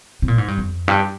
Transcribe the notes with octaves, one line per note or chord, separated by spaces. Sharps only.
C3
A#2
G#2
G2
F2
G2